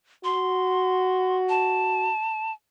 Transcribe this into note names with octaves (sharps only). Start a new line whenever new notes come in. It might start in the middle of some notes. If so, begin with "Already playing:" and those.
F#4 C6
A5